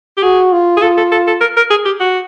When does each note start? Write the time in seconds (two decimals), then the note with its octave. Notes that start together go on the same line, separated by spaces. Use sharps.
0.17 G4
0.23 F#4 G#4
0.52 F4
0.77 G#4
0.82 F4 A4
0.97 A4
1.11 A4
1.27 A4
1.41 A#4
1.57 A#4
1.70 G#4
1.85 G4
2.00 F#4